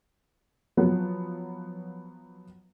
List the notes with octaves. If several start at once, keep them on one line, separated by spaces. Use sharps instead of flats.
F3 F#3 B3